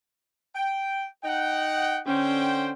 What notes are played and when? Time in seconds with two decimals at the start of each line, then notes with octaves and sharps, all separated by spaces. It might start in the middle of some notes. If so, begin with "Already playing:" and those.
0.54 G5
1.23 D#4 F#5 G5
2.07 D3 C#4 C5 G5